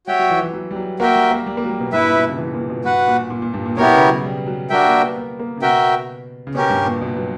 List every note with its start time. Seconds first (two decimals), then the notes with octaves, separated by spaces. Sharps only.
0.07 G3 F#4 C#5 E5 G5
0.19 F#3
0.30 E3
0.42 E3
0.53 F#3
0.71 G3
0.76 F#3
0.99 A#3 F#4 A#4 E5 G5
1.15 G3
1.31 A#3
1.46 G3
1.57 A#3
1.64 F#3
1.69 G3
1.80 B2
1.92 G2 E4 B4 E5
2.04 A#2
2.16 B2
2.27 C#3
2.38 E3
2.54 A#2
2.70 B2
2.84 G2 F#4 B4 F#5
3.08 A#2
3.30 A#2
3.42 A#2
3.54 G2
3.66 A#2
3.77 B2 B3 E4 G4 A#4 C#5
3.93 C#3
4.07 F#3
4.24 G3
4.46 F#3
4.69 G3 D4 F#4 A#4 E5 G5
4.85 A#3
5.01 B3
5.16 B3
5.40 A#3
5.57 C#3
5.62 B2 F#4 A#4 E5 G5
6.47 C#3
6.55 B2 C#4 G4 A#4
6.70 G2
6.85 A#2
7.01 B2
7.16 F#3